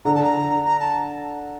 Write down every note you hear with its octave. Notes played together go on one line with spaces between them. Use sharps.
D3 A#5
A5
A#5
A#5
A5